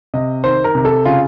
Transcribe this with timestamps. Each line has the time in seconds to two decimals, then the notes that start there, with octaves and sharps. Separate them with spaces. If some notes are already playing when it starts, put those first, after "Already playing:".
0.14 C3 D#5
0.44 D#3 C5
0.64 A#4
0.75 C3
0.85 A4
1.05 C#3 F4